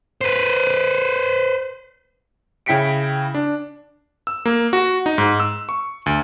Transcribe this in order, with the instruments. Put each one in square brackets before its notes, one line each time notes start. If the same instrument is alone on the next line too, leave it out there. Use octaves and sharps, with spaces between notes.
[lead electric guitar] B4 C5
[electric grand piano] C#3 E4 G5 B6 C#7 D7
D4
E6
A#3
F#4
D#4
G#2
E6
C#6
D2